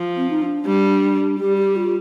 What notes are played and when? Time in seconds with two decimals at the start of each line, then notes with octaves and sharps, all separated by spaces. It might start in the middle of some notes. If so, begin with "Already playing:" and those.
Already playing: F3
0.17 C4
0.30 D#4
0.42 D4
0.66 G3
1.39 G3 G4
1.58 G4
1.76 F4